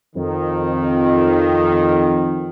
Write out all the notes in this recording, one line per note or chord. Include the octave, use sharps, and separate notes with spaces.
F2 D#3